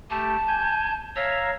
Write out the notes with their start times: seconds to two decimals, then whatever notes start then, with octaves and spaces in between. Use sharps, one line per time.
0.10 A3 G4 A5
0.47 G#5 G6
1.16 C#5 E5 F5 A#5